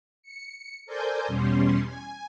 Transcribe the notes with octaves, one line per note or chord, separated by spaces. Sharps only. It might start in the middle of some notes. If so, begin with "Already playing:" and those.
C#7
A4 A#4 C5 D5 G#5 G6
E2 B2 G3 C#4 C6
G#5